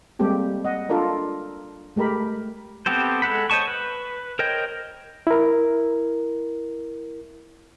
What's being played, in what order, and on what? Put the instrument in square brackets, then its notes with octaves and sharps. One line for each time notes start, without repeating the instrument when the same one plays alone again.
[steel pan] G3 G#3 A#3 C4 G4 A4
D#5 F#5
D4 F4 A4 A#4 D5
G#3 A3 G4 A#4 B5
[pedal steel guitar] B3 C4 G4 A4 C5
G#3 A4 F#5 B5
C5 C#5 D#5 A5 C#6
B4
A#4 C5 C#5 D#5 G5
[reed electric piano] E4 A#4